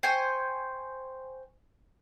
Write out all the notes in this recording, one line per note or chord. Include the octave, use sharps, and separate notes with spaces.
C5 G5 G#5 C#6